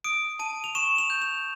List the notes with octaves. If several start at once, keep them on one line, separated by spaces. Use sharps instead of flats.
D#6 D7
A5 D#7
F7
C#6 E7
F7
G6
F7